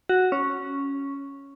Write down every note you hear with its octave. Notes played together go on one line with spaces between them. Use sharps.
F#4
C#4